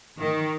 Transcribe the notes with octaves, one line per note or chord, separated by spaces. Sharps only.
D#3